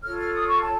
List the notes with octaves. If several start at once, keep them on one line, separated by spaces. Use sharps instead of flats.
F4 A4 C#5 F6
F6
D#6
C#6
A5